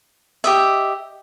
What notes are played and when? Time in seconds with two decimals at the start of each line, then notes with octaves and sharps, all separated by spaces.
0.44 G4 D#5 E5